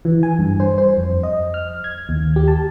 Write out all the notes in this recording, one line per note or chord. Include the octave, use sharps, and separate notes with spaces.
E3
G#5
G2
C5
C5
F2
D#5
F6
G#6
D#2
G4
A5